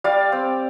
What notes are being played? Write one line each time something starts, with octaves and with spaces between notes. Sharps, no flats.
G3 D5 F5
C4